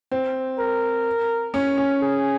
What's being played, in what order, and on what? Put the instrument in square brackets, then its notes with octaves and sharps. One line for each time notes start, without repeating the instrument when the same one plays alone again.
[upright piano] C4
[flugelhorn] A#4
[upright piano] C#4
C#4
[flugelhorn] G#4